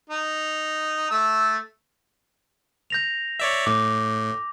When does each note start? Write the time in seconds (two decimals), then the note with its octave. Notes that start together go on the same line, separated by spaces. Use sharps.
0.09 D#4
1.11 A3 E6
2.90 G6 A#6 F7
3.40 C#5 D5 E5
3.67 A2 D6